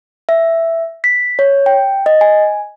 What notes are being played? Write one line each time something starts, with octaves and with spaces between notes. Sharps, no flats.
E5
B6
C#5
G5
D#5
G#5